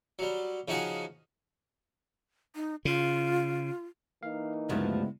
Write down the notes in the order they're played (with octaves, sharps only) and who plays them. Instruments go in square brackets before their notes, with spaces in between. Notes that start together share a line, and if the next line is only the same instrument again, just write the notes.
[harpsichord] F#3 G3
C#3 F3 D#4 F#4 G#4 F#5
[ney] D#4
[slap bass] C#3 [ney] F4
[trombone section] E3 A#3 D#4 [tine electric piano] F5
[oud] D2 G2 F3 [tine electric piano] C#3 B3 E4 [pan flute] G#3